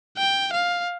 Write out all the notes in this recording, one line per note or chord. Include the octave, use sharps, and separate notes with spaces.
G5
F5